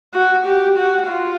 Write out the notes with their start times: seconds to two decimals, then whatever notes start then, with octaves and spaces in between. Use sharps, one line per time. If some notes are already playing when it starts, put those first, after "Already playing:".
0.14 F#4
0.45 G4
0.77 F#4
1.07 F4